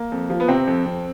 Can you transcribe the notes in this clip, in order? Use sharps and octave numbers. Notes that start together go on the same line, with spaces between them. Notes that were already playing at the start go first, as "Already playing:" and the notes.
Already playing: A#3
F2
F3
B3
C3 C4
F2
F2